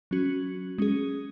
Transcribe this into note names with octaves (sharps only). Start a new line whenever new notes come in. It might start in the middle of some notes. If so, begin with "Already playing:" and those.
F#3 C#4 F#4
G#3 C#4 G#4